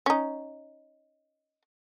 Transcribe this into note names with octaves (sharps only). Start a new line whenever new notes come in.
C#4 D#4